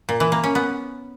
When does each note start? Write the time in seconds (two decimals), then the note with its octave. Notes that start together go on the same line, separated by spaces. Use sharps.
0.09 A#2
0.20 E3
0.32 A#3
0.44 C#4
0.55 B3